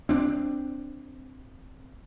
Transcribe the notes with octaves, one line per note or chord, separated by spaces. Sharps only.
C4 D4